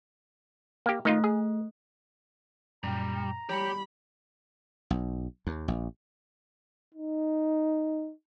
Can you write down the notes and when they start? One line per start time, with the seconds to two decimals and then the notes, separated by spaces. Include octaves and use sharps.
0.86 A#3 G4
1.05 D#3 A3 D#4 F4
1.24 G#4
2.83 F#2 A#2 G3 G5 A#5
3.49 G3 G4 C#5 G5 B5 G6 C#7
4.90 B1
5.47 D#2
5.68 A#1
6.94 D#4